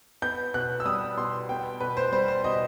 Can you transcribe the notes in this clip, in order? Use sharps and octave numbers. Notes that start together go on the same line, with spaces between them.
B3 G6
B2 F#6
E6
G3 D#6
B2 C6
B3 G5
B2 B4
C5
G3 C5
C5
B2 D#5